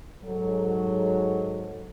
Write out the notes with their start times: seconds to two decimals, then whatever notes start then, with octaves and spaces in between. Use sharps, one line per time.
0.24 G#2 F#3 A4